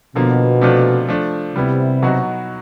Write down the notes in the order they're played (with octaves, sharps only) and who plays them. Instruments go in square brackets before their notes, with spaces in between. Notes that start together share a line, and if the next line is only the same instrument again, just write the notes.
[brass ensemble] B2 [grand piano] D3 F3 A#3
[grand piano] C3 F3 A3 D4 F4
F3 A3 D4
[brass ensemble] C3 [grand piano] G3 B3 E4
[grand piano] B2 F#3 B3 D#4 F#4